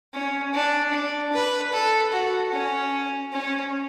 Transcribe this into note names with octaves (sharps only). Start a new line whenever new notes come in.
C#4
D4
D4
B4
A4
F#4
C#4
C#4